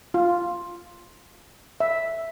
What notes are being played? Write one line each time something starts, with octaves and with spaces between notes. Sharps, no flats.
F4
E5